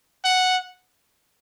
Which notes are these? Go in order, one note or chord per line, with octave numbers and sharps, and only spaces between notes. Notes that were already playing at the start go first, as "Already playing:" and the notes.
F#5